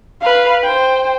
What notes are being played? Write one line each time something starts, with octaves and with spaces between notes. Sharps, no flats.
B4 F5
C5 G5